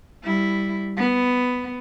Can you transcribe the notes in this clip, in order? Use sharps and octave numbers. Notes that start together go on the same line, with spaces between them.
G3 E4
B3